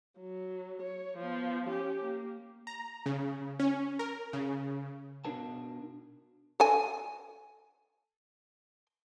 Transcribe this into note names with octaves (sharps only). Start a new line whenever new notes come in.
F#3
C#5
F3 B3
C#4 G4
A#3
A#5
C#3
C#4
A#4
C#3
B2 D4 D#4 A#4 A5
A4 G5 G#5